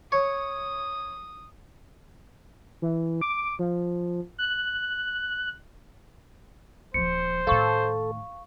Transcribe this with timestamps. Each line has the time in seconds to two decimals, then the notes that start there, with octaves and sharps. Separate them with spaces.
0.12 C#5 D#6
2.82 E3
3.21 D6
3.59 F3
4.38 F#6
6.94 D#1 F3 C5 C#7
7.47 A2 D#3 A4 F5 C#6